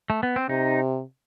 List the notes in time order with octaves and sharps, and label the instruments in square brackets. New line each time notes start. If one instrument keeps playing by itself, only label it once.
[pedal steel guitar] A3
B3
C4
[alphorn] C3 [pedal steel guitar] D#4